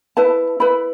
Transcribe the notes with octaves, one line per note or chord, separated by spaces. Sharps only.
E4 B4 A5
E4 B4 B5